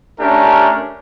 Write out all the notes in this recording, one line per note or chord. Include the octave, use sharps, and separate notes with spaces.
A3 C#4 D4 G4 A#4